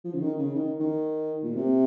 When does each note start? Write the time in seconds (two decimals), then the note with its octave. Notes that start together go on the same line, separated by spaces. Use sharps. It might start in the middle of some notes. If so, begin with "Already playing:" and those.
0.05 F3
0.14 C#3
0.21 D#3
0.39 C#3
0.55 D#3
0.80 D#3
1.44 A#2
1.56 C3